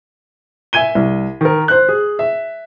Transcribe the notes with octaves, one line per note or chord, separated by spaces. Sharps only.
E5 G#5 G#6 D#7 G7
C2
D#3 A#4
C5 F#6
G#4
E5